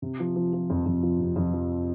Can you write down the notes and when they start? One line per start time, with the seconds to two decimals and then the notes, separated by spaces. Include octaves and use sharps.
0.02 C3
0.20 F3
0.36 F3
0.53 F3
0.70 F2
0.86 F2
1.03 F3
1.20 C3
1.36 F2
1.53 F3